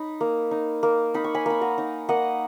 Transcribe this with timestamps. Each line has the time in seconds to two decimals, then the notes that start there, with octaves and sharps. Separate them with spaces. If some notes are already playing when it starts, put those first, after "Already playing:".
Already playing: D#4 B5
0.21 A#3
0.51 D#4
0.83 A#3
1.14 D#4 B5
1.24 C#6
1.34 G#5 B5
1.46 A#3 B5
1.61 F#5 A#5
1.78 D#4
2.09 A#3 D#5 F#5